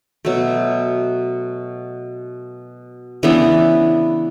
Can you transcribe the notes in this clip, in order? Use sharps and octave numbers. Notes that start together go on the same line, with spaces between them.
B2 F#3 A3
C#3 E3 B3 D4